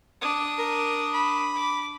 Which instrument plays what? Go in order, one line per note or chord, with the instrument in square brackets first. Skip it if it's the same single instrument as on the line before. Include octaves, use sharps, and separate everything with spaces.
[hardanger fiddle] D4 D#6
[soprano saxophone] A#4
B5
[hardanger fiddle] D6